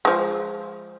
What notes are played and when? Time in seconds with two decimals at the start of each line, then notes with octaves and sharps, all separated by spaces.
0.05 F3 G#3